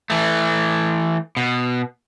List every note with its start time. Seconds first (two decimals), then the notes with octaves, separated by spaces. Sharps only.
0.10 E3 A3
1.37 B2